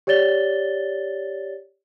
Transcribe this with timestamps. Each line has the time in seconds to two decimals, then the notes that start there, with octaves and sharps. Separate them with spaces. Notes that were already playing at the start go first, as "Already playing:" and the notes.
0.07 G4 C#5 D5 A6 G7